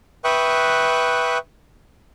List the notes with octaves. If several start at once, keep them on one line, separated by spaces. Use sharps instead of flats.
B4 E5 G5 C#6 D#6 F#6